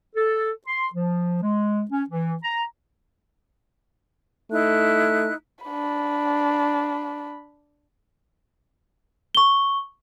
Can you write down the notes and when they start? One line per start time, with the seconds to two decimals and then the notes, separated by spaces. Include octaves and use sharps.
0.16 A4
0.67 C6
0.94 F3
1.43 G#3
1.91 C#4
2.09 E3
2.42 A#5
4.51 A3 D#4 E4 F#6
5.65 D4 B5
9.35 C#6 G7